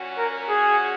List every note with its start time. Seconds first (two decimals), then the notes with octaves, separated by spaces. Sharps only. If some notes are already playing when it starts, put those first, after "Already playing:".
Already playing: A#2 F#3 C#4 F#4
0.18 A#4
0.49 G#4